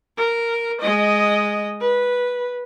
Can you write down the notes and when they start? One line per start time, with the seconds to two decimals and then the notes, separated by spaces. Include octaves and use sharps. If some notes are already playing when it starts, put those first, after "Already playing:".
0.17 A#4
0.81 G#3 D#5
1.81 B4